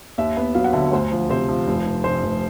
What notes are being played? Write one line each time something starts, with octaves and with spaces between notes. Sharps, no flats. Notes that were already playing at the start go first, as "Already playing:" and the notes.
D#2 E5
B3
F#3 F5
F#5
D3 E5
D2 C5
F3
C3 C5
F3
F1
F1
F1 C5
F1